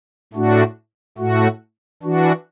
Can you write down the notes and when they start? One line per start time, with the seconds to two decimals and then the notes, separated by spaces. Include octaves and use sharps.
0.33 A2 A3 D4 F#4
1.18 A2 A3 F#4
2.03 E3 D4 F#4